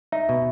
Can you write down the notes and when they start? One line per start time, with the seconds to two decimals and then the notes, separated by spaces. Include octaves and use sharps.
0.12 D#4 E5
0.29 B2